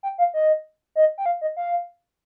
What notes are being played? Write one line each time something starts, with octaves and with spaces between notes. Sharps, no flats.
G5
F5
D#5
D#5
G5
F5
D#5
F5